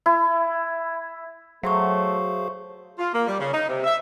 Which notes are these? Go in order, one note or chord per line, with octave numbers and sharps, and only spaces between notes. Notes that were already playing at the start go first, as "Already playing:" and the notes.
E4
F#3 A3 G#4 C5 E5 F5 C6 C#6
F4
A#3
G3
C#3
D#4
C3
E5